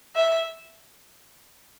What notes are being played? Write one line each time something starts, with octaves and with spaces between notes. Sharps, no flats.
E5